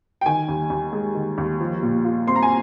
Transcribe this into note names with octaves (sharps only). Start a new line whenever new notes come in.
G5
D#3 G#5
D#2
D#2
G#3
D#3
D#2
F3
A#2
F4
C4 C6
A#5
G#5